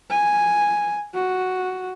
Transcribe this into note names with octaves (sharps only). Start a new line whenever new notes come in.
G#5
F#4